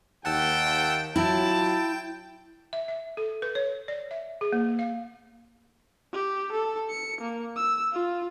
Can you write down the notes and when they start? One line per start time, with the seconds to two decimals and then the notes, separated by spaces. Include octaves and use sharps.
0.25 D#2 F#5 G5 A5 E6
1.16 F#3 E4 F4 G5 A5
2.73 E5
2.88 E5
3.17 A4
3.42 B4
3.55 C#5
3.88 D5
4.11 E5
4.41 G#4
4.52 A#3
4.79 F5
6.12 G4
6.52 A4
6.90 C#7
7.21 A#3
7.56 E6
7.92 F4